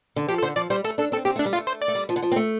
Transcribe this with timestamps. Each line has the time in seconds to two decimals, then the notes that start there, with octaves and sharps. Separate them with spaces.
0.16 D3
0.28 F3 G4
0.38 A4
0.42 D3 C5
0.56 F3 D5
0.70 G3 C5
0.84 A3 A4
0.98 D4 A4
1.12 C4 A4
1.25 C4 G4
1.36 A3 D4
1.46 G3
1.53 A3 F4
1.67 C5
1.82 D5
1.88 A3
1.95 G3
2.09 F3
2.16 D3
2.22 F3
2.32 C4
2.36 A3